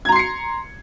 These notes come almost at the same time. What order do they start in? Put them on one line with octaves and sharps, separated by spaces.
G#6 A#5 C6 C7 C#7